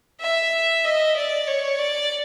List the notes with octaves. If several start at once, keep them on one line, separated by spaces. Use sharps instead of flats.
E5
D#5
D5
C#5
D5